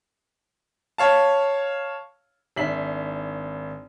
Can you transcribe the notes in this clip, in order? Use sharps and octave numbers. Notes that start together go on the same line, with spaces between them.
C#5 F5 A5
G#1 D4 E5 B6 C7 F#7